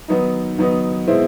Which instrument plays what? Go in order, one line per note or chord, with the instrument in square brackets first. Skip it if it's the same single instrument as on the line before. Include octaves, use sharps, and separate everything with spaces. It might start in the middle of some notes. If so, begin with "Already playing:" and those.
[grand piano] D#3 F#3 B3 D#4
D#3 F#3 B3 D#4
B2 G#3 C4 E4